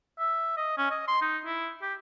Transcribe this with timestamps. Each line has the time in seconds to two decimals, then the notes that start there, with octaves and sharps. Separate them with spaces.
0.19 E5
0.57 D#5
0.78 C#4
0.91 D#5
1.08 C6
1.22 D#4
1.45 E4
1.82 G4